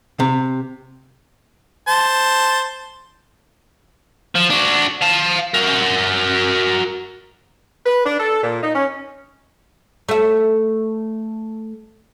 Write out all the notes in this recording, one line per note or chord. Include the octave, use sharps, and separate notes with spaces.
C3
C5 A5
F3
D4 F#4
F5 A5
F#4 A#4
B4
D4
A4
A#2
D#4
C#4
A3 E5